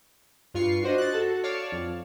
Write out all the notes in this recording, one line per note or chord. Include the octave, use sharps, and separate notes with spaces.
G2 F4 C#6 C7
D4 F#4 C5 D#5
F#6 A6
F#4 A4 A5
C#5 D5 F5 A5 C#6
F2